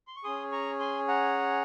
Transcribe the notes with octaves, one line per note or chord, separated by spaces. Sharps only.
C6
C#6
C#4 G#4 C6 D#6
A#5 C#6
G#5 C6
F#5 A#5